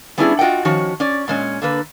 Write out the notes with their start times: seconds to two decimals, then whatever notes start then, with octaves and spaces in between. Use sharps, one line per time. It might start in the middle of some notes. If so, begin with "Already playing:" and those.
0.18 G3 B3 C#4 D4 E4 G#4
0.39 F4 F#4 B4 D#5 F#5 G5
0.65 D#3 F3 C#4 F#4 C#5
1.00 C#4 D5
1.28 A#2 G#3 C#4
1.62 D3 A#3 B4